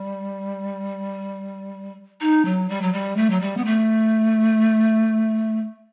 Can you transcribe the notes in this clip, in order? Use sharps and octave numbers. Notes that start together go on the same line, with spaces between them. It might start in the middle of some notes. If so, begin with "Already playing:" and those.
Already playing: G3
D#4
F#3
G3
F#3
G3
A3
F#3
G3
B3
A3